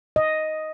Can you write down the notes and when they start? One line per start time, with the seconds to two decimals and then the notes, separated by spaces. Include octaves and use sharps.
0.16 D#5